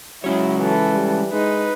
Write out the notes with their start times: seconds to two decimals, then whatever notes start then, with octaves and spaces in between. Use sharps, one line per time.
0.24 F#3 G#3 C#4 E4 C#5
0.61 E3 A4
0.94 G3
1.32 G#3 D#4 B4